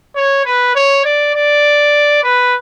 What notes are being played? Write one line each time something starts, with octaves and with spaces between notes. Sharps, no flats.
C#5
B4
C#5
D5
D5
B4